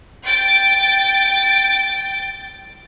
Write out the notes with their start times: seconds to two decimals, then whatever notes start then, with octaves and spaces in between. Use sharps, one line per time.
0.25 G5 A6 D7